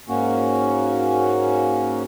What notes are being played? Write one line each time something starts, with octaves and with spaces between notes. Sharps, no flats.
G#2 A#3 C#4 F#4